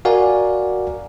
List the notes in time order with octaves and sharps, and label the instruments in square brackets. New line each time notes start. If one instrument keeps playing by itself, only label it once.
[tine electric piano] F#4 A#4 D5 F5 F#5 G#5